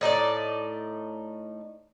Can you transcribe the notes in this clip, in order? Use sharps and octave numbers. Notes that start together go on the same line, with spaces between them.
A2 D#4 G#4 D5